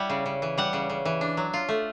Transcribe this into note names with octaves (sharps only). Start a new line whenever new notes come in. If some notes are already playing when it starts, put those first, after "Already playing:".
Already playing: G3 E4 F#5
C#3
C#3
E3
G3 F#5
C#3
C#3
E3
D4
F#3
F4
A3